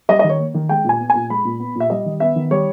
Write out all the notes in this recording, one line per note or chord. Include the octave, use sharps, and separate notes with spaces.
G3 D#5
D#5
D#3
C#5
A#3
D#3
G#3 G5
A#2 G#5
B3
G#5
A#2
G#3 B5
A#2
B3
A#2
E5
G3 D#5
D#3
B3 E5
D#3
G3 C#5